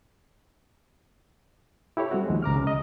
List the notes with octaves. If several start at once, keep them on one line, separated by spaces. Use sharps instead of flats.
E4 G4 A4 C#5
G3 C4 F#4
D#2 F3 G#3
C#2 A#5 D6 F6
C#3 G#3
D#5